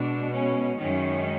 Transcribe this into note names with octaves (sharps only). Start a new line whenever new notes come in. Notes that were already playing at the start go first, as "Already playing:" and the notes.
Already playing: B2 G#3 D4
C#4
F#2 D#3 G#3 C#4